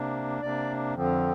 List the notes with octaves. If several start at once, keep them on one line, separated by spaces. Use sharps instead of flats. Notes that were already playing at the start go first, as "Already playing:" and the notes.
Already playing: C3 A#3 D4
C3 A#3 D4 D5
F2 D3 F3 C4